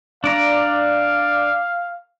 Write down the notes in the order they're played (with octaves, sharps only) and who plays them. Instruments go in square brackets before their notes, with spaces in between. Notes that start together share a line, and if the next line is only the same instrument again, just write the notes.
[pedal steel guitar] D4 D5 A#5 [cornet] F5